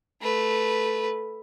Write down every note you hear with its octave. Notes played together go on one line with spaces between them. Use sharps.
A3 B4